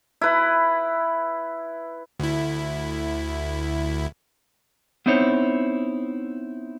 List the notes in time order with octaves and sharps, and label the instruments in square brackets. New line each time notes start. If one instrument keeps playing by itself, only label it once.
[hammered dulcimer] E4 B4
[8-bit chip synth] D2 E4
[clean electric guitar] B3 C4 D#4 E4 C5 C#5